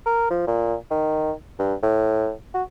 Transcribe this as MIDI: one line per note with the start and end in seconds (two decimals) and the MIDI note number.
0.06 0.29 70
0.30 0.42 53
0.47 0.75 46
0.91 1.32 51
1.59 1.74 43
1.82 2.31 45
2.54 2.63 66